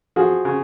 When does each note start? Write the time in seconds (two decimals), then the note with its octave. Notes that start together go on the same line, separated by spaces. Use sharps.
0.16 F3 F#4 G#4
0.45 C#3